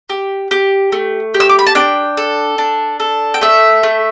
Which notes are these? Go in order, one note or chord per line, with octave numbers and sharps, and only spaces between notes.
G4
G4
A3
G4
E6
D6
B5
A5
D4 G5
A4
D4
A4
G5
A3 E5
A3